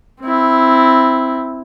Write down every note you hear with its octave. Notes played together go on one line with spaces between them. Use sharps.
C4 E4